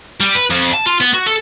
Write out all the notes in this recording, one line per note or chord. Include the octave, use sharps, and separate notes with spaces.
G3
B4
F2
A5
F4
B3
F#4
A4